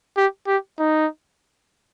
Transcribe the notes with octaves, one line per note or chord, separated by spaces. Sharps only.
G4
G4
D#4